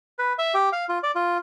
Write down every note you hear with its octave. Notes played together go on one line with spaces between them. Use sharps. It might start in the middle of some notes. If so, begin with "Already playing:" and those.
B4
E5
G4
F5
F4
D5
F4